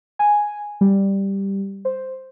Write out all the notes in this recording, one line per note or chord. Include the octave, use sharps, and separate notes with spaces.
G#5
G3
C5